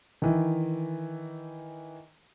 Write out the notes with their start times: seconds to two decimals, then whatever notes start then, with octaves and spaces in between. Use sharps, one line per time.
0.22 D#3 E3